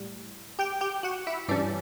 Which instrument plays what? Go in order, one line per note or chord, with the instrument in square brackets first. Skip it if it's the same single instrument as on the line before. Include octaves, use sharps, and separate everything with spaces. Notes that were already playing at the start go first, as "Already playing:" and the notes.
Already playing: [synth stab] A2 G3
G4 G5
G4 G5
F#4 F#5
E4 E5
G2 E3 G3 C#4 D4 D5